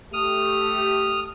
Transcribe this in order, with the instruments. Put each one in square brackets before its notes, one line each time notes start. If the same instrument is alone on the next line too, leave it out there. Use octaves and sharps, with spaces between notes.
[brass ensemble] A3 G4 [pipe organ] D#6 F6